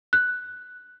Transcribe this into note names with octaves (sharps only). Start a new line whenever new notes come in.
F#6